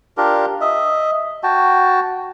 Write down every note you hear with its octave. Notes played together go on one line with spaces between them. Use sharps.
D4 F4 G4 A#4
D#5 E5
F#4 G5 A5